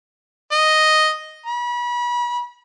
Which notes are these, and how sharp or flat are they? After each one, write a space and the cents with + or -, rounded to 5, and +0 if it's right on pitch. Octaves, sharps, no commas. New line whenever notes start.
D#5 +0
B5 -35